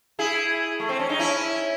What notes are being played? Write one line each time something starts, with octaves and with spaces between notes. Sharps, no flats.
E4 G#4
A3
C4
C#4
D#4
C#4 E4